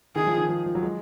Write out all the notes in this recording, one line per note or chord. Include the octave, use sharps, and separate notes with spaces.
D#3 G#4
F3
D#3
F3
F3
F#3
G#3